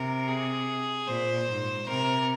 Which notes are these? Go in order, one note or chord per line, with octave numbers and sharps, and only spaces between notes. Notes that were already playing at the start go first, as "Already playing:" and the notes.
Already playing: C3 A#4
G#4
A#2 C5
G#2
C3 A#4